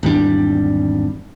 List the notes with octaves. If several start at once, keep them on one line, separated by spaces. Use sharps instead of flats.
G#1 E2 G3 D4